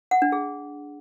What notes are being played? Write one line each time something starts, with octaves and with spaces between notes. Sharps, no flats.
F#5
D4
G#4